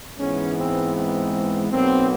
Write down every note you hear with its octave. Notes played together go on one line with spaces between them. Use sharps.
G#2 E3 G#3 B3 C#4
C4
C4
B1 B2 F#3 A#3 C4